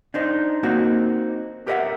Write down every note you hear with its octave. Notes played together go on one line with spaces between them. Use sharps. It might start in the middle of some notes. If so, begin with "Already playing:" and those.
D4 D#4 C5
A#3 C4 D#4 F#4
G4 A#4 B4 D#5 E5 F#5